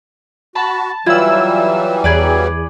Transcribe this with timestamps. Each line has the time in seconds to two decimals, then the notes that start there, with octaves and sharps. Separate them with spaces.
0.55 F#4 A5 B5
1.06 E3 F#3 G3 E4 F4 E6
2.04 E2 G#4 B4 D5